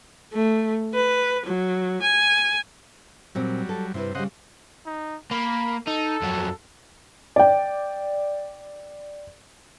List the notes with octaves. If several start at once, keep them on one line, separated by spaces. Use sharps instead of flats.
A3
B4
F#3
G#5
A#2 F#3 G3 C4
A4
G2 C3 C4 E4 B4
C#3 G3 C5 D#5 F#5
D#4
A#3 B5
D#4 A4
F2 F#3
D5 G5